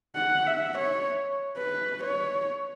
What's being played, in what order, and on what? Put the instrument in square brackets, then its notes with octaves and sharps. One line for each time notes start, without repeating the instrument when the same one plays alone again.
[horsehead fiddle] F#5
E5
C#5
B4
C#5